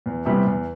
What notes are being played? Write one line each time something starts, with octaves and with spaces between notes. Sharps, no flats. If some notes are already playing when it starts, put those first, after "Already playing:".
E2
C3 E3 G3 B3
E2